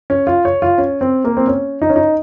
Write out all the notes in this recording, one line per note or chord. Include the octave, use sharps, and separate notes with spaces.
C#4
F4
C#5
F4
C#4
C4
A#3
C4
C#4
D#4
C#4
D#4